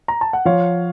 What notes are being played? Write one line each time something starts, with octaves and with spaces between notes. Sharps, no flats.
A#5
A5
F#5
F3 C#5 F5